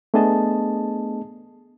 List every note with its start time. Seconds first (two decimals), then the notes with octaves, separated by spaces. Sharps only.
0.14 A3 B3 D4 G#4 D#5 A5